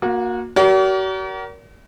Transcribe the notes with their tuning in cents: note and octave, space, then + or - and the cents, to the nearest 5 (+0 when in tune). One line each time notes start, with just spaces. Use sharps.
A#3 +10 F#4 -30
F#4 +45 A#4 +10 D5 -45